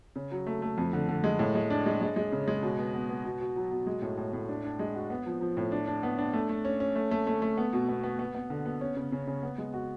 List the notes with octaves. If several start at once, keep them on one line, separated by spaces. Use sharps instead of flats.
C#3
F#3
A3
A3
F2
D3
D3
G#3
A2
G#3
D4
G#3
G#3
G#3
C#3
G#3
B2
B3
B3
B3
B2
F#4
F#3
B2
G#3
A2
A2
A2
D4
D4
G#3
F#4
B3
F3
F3
A2
D4
D4
B3
D4
A3
A3
C#4
C#4
A3
A3
A3
A3
B3
B2
B3
B3
B3
B3
D3
B3
C#4
C#3
C#3
C#3
B3
G#3
F#4